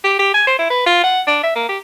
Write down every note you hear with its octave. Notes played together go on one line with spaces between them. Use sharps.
G4
G4
G#5
C5
E4
B4
F4
F#5
D4
E5
A#3
G4